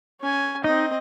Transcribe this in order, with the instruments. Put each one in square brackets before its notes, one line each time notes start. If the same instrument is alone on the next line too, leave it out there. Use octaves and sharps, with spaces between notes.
[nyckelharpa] C#4 G#5
[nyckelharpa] C4 D#5 [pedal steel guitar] D#4